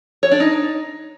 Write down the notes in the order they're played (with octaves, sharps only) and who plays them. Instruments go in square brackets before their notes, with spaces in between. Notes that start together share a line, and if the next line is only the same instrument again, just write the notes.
[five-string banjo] C#5
D4
D#4